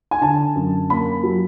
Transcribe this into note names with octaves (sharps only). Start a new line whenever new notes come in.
G#5
D3 A5
F#2
A#3 B5
F#3